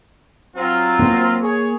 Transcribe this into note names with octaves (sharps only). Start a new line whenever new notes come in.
F#3 C4 F4
A#3
G#4 C#5